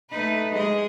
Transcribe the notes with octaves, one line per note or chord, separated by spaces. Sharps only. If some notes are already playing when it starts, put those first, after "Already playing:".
A3 D#4 B4
G#3 G#4 D#5